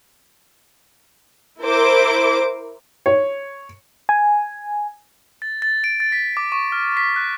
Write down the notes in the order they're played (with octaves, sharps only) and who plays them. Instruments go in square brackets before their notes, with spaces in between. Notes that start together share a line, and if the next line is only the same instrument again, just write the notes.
[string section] E4 A#4 C5 D6
[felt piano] C#5
[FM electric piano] G#5
[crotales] A6
A6
D7
A6
B6
D6
C#6
F6
B6
F#6